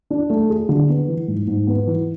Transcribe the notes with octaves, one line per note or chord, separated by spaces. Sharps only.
D4
A3
G#4
D3
B3
E3
G#2
G#2
B3
E3